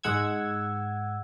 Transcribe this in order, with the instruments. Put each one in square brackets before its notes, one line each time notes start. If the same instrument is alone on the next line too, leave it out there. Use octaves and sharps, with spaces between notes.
[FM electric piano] G#2 G#3 F#5 E6 G#6